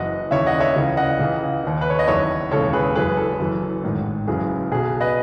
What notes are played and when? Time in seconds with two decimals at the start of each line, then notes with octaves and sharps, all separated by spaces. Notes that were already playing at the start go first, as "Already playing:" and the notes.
Already playing: F#1 F#2 E3 D#5 F#5
0.31 D#2 C#3 E3 C#5 E5
0.46 D#5 F#5
0.60 C#5 E5
0.76 C#2 C#3 E3
0.97 D#5 F#5
1.19 C#2 C#3 E3
1.63 D#2 D#3
1.81 B4
1.90 C#5
1.99 D#5
2.08 F#1 E2 D#3 C#5 E5
2.51 E1 D#2 C#3 E3 A4 C#5
2.73 G#4 B4
2.95 F#1 F#2 E3 G#4 B4
3.17 A4
3.40 F#1 F#2 E3
3.83 A1 G#2 D#3
4.27 F#1 F#2 C#3 E3 G#4
4.72 B1 B2 G#4
5.01 B4 D#5